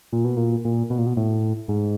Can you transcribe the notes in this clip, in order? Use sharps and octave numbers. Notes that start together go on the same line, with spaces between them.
A#2
B2
A#2
A#2
B2
A#2
B2
A2
G#2